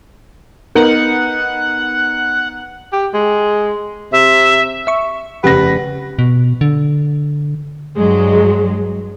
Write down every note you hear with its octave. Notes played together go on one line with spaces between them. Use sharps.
B3 D#4 A#4 F#5
G4
G#3
C3 E5
E5 C#6
F1 C#3 G4 B4 F#5 A#6
B2
D3
G2 F#3 G#3